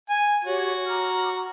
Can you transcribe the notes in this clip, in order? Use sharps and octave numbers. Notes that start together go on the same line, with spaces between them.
G#5
F#4 G4 C#5
A#5 D6 F6